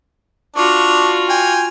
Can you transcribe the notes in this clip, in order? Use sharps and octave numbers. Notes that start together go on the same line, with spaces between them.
D4 F4 F#4 C#6
G5 G#5